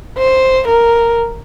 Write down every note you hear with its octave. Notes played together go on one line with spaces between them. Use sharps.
C5
A#4